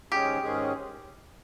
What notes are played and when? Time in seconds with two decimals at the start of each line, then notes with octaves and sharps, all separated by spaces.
0.12 G#2 D#3 G#3 C#4 G4 G#4
0.42 G#2 D#3 G#3 C#4 G#4